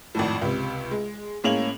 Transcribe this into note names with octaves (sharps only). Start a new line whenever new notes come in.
G#1 F2 A2
C#2 C3
G#3
A2 G#3 A#3 C#4 F7 F#7